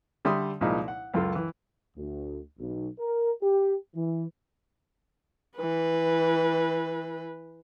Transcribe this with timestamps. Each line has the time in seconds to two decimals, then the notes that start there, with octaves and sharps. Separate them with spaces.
0.25 D3 G3 E5 B5 C6 D#6
0.61 C2 A#2 F3 G#3 D#4 B5
0.88 F#5
1.14 C#2 F#2 F4 A4
1.35 E3
1.97 D2
2.59 B1
2.98 A#4
3.41 G4
3.94 E3
5.57 E3 B4